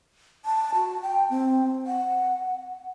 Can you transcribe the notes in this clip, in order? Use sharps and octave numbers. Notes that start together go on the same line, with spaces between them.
A5
F#4
G5
C4
F#5